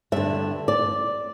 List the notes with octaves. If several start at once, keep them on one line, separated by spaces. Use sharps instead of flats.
G2 D3 E5
D5